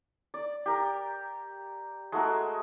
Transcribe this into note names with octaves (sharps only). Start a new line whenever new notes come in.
D5
G4 A#4
G#3 A3 F#4 A#4